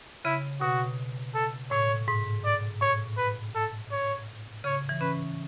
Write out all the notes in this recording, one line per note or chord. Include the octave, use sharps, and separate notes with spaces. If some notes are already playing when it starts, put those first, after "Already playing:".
C#3 E4
B2 F#4
A4
A2 C#5
G#2
D5
A2 C#5
B4
A4
C#5
C#3 C#5
E3
C#4 B4